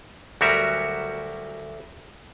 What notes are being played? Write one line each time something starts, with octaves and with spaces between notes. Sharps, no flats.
D2 F#3 G3 F#4 A#4 E5